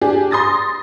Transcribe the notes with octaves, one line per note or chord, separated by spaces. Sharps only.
D4 G4 G#4
C6 D#6 A6 A#6